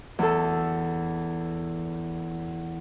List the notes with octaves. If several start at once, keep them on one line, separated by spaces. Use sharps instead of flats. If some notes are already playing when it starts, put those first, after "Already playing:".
E2 A4